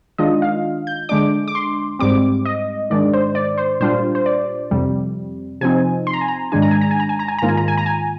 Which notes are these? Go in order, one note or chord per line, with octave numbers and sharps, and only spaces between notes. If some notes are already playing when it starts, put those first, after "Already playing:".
D#3 G#3 D4 F4 D#5
F5
G6
D3 G#3 D4 D6
D6
C6
G#2 G3 C4 D6
D#5
G#2 D#3 G#3 D4 D5
C5
D5
C5
A#2 G3 D4 F4 C5
C5
D5
F2 C3 G3
C3 F3 C4 D#4 G#5
C6
A#5
G#5
A#5
G#2 D#3 G#3 D4 G#5
A#5
G#5
A#5
G#5
A#5
G#5
A#5
G#5
G#2 D#3 A#3 F4 A#5
G#5
A#5
G#5
A#5
G#5